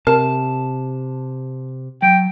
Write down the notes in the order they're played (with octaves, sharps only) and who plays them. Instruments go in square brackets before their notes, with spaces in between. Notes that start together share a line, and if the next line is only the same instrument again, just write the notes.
[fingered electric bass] C3 [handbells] A#4 [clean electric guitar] A5
[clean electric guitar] F#3 [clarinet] G5